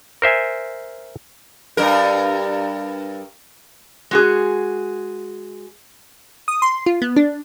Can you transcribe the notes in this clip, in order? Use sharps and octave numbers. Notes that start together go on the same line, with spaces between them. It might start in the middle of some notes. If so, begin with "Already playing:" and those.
A#4 C5 E5 G#5
G2 A#4
G#3 F#4 G#4
D#6
C6
F4
B3
D4